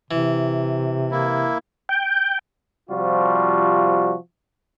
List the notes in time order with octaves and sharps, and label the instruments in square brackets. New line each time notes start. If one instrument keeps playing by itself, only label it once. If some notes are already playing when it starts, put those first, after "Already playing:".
[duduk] C3 [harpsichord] E3
[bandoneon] A#3 E4
[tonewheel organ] G5
[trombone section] C3 F3 G3 F4 F#4